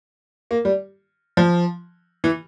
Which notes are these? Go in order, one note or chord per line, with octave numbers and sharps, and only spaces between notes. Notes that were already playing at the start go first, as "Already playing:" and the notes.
A#3
G3
F3
E3